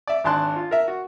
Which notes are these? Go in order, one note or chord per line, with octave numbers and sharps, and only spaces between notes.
D5 E5
G#1 D4 A5 C6 F#6
F4
A#4 E5
F#4